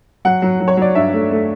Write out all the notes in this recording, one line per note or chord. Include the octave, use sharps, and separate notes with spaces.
F#3 F#5
F#3
F#3
C#5
F#3 D5
G2 E5
A3
A3